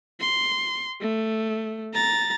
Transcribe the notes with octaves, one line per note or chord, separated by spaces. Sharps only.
C6
A3
A#5 A6